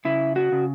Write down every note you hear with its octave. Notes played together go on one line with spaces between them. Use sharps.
C#3 E4
F#4
C#3